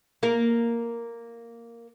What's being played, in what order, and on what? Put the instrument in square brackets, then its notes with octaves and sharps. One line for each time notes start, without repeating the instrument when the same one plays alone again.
[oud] A#3 A#4